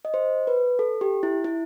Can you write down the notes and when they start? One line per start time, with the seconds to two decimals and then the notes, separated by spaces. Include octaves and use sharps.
0.05 D#5
0.14 C5
0.47 B4
0.79 A4
1.01 G4
1.23 E4
1.44 E4